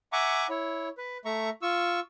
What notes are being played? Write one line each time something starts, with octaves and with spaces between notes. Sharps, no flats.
E5 F#5 G#5 A#5 C#6 D6
E4 C#5
B4
A3 E5 A#5 C#6
F4 C#6 E6